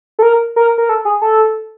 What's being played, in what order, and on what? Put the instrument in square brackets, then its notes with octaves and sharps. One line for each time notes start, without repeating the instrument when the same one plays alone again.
[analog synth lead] A4
A#4
A#4
A#4
A4
G#4
A4